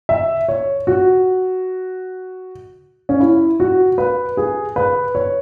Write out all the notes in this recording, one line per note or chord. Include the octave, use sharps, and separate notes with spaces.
E5
C#5
F#4
C#4
E4
F#4
B4
G#4
B4
C#5